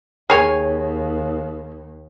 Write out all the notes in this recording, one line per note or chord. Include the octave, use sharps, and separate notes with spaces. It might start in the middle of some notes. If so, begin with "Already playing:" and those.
D#2 G#4 C#5 G#5